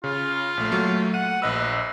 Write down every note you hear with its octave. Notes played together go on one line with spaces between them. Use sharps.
C#3 F4
A#1 A3
F#3 A3 A#3
F#5 D#7
A#1 B4 D#5 E6